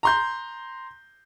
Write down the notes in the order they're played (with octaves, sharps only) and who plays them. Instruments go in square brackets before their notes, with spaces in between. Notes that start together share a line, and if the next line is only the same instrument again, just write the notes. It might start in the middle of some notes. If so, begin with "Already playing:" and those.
[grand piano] A#5 C6 G6